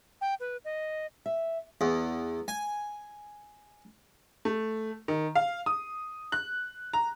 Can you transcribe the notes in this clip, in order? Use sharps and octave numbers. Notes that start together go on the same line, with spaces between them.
G5
B4
D#5
E5
E2
G#5
A3
D#3
F5
D#6
F#6
A#5